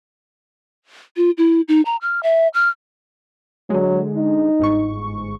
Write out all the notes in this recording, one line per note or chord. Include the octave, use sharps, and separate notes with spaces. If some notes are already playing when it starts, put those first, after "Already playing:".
F4
E4
D#4
A#5
F6
E5
F6
D3 F#3 G#3
D#4
G1 G#2 C#6